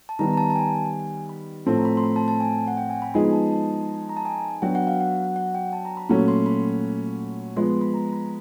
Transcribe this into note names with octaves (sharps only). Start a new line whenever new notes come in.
A5
D#3 G3 B3 D#4 A#5
A#5
A5
A5
G#5
B5
A2 F3 A3 C4 A5
A#5
B5
C6
B5
A5
A5
G#5
F#5
G5
G#5
B5
F3 G#3 B3 D#4 G#4 B5
A5
A5
A5
A#5
A5
G#5
F#3 B3 D4 F#4 G5
F#5
F5
F#5
F#5
G5
A5
A#5
B5
A#2 F#3 A3 C#4 F#4 B5
C6
B5
F3 G#3 B3 C6
B5
A#5
B5